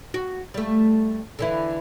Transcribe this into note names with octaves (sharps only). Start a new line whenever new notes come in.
F#4
G3 A3
D3 E3 E4